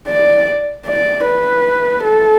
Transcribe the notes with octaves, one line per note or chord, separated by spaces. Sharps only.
D5
D5
B4
A4